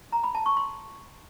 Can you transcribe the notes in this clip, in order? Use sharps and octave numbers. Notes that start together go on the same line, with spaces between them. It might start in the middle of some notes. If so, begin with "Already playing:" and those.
A#5
B5
A5
C#6
C6